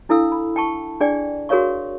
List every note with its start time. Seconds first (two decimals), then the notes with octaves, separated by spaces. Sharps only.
0.09 D4 E4 A4 F5 E6
0.32 B5
0.56 G5 A5 C#6
1.00 D4 G#4 D5 G5
1.49 F#4 G#4 A#4 C#5 F5 C#6